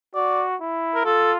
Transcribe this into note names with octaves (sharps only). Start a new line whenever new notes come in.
F#4 D5
E4
A#4
F4 A4